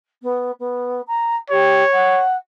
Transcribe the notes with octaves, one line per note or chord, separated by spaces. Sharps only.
B3
B3
A#5
G4 C#5
F#5